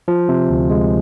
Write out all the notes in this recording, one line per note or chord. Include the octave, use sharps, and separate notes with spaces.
F3
C3
D2
G#3